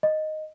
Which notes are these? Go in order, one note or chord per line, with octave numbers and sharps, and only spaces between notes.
D#5